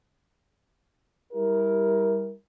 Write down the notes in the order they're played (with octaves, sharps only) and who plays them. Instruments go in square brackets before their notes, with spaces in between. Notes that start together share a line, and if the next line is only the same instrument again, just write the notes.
[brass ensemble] G3 E4 G4 A#4